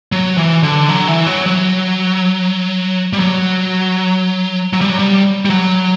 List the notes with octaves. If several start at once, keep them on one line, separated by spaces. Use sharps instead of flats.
F#3
E3
D3
F#3
E3
F#3
F#3
G3
F#3
F#3
G3
F#3
G3
G3
F#3